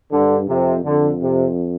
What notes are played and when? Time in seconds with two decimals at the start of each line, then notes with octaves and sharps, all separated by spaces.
0.12 G2 D3
0.48 F2 C3
0.85 F2 D3
1.21 C3